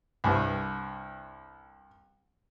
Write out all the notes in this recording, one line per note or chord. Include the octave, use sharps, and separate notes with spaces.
C2 G2